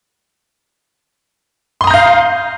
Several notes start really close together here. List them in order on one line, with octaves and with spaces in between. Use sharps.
C6 D#6 A#5 G6 F5